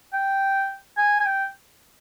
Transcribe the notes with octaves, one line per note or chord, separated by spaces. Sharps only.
G5
G#5
G#5
G5